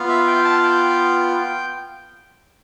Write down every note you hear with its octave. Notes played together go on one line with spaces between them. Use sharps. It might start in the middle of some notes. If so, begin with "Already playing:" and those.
Already playing: B3 F4
E5
G5
A5
G5